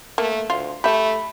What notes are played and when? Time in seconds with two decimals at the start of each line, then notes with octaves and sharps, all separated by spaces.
0.18 A3 A#3
0.50 D2 F4
0.84 A3 G4 E5 B5